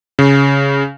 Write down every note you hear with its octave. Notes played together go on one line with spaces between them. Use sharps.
C#3